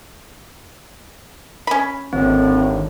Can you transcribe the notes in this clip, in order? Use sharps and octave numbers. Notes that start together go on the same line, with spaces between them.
C#4 B5
G#1 D#2 A2 D3 C4